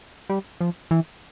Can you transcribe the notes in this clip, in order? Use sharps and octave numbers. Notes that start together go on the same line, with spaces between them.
G3
F3
E3